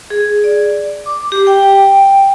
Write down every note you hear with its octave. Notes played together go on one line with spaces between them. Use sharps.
G#4
D5
D6
G4
G5